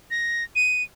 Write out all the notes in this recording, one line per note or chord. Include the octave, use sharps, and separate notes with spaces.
A#6
D#7